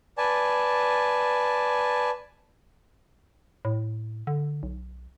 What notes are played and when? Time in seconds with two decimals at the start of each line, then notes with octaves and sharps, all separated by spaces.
0.18 B4 D5 G#5 A5
3.65 A2
4.27 D3
4.63 B1